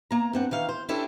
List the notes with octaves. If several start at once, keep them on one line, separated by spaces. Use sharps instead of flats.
A#3 A#5
G2 C4 F#5
D#3 E3 F5
C5
C#4 D4 E4 G4 A4